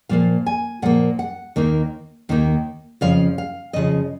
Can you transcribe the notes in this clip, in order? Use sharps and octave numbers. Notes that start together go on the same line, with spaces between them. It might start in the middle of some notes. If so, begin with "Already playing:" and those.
A#2 F3 A#3 F5
G#5
A#2 F3 A#3 F#5
F#5
D#2 D#3 A#3 D#4
D#2 D#3 A#3 D#4
F2 C#3 F3 F5
F5
F2 C#3 F3 D#5